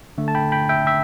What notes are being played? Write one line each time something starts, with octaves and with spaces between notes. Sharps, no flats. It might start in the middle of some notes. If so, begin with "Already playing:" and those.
D3 A3
A5
G5 B5
G5 B5
E5 G5
E5 G5